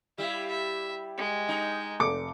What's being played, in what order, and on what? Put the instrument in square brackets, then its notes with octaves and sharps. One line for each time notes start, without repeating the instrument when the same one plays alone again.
[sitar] G3 E4 [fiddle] E5 F5
[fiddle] E5
G#3
[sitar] D#4
[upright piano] F1 D6 C#7